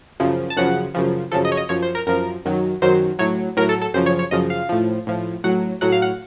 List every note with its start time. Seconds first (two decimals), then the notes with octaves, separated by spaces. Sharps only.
0.20 F#2 C#3 F3
0.50 A5
0.57 F#2 C#3 F3 F#5
0.94 F#2 C#3 F3
1.32 F#2 C#3 F3 A4
1.45 D#5
1.52 C#5
1.57 D#5
1.69 F#2 F3 C#5
1.82 C5
1.95 A#4
2.07 F#2 F3 A#4
2.45 F#2 D#3 F#3
2.82 F#2 D#3 F#3 C5
3.19 A2 F#3 C#5
3.57 A2 F#3 A#4
3.69 A4
3.82 A4
3.94 F#2 C#3 F3 C5
4.06 C#5
4.19 C#5
4.31 F#2 C#3 F3 D#5
4.50 F5
4.69 A2 F3
5.07 A2 F3
5.44 A2 F#3 F#5
5.81 A2 F#3 F#5
5.92 F5
6.02 F#5